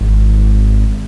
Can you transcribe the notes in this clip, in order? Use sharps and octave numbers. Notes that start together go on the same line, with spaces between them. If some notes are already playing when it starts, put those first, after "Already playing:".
G#1